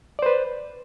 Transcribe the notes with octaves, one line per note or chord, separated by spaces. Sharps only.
B4 C5 D5